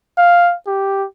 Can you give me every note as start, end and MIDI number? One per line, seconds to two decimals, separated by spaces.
0.18 0.55 77
0.67 1.06 67